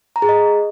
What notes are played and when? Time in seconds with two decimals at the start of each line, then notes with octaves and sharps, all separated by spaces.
0.16 A#5
0.22 G#4
0.29 D#5